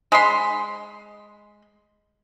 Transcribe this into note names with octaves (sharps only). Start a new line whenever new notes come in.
G#3 B5 C6